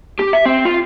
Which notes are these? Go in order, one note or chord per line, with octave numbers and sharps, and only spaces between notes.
G4
E5
C4
F4